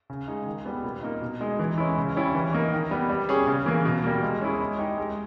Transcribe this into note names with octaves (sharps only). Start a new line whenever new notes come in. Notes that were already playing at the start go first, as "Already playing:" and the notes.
C#3
G#3 D#4 G#4
D#3
G3 B3
A#2
A#3 D#4
B2
G#3 D#4 G#4
E3
G#3 C#4 E4
C#3
G3 C#4 E4
E3
A#3 D#4
D#3
G3 B3
G3
C#4 G#4
C#3
E3 A#3
B2
G3 A#3
G#3
C#4 E4 G#4
G#3
D#4 G4
G#3